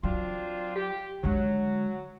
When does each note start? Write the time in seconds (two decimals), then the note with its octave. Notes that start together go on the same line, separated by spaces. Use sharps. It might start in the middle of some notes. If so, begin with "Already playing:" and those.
0.03 F#3 C4 D4 F4
0.76 G4
1.24 D3 F#3 G#3